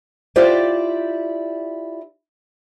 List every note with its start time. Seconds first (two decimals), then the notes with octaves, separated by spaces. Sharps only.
0.36 E4 F4 G4 C5 D5